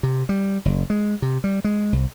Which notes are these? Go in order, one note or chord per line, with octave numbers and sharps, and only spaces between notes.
C3
G3
F#1
G#3
C3
G3
G#3
C2